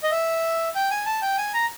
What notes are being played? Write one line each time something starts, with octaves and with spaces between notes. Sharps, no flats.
D#5
E5
G5
G#5
A5
G5
G#5
A#5